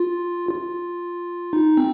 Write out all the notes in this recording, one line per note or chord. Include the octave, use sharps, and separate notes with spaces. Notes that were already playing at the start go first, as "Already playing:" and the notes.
Already playing: F4
F4
D#4
C4